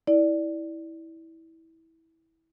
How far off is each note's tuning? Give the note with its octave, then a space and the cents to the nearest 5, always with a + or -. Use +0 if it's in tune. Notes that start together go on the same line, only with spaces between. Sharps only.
E4 -20 D5 +0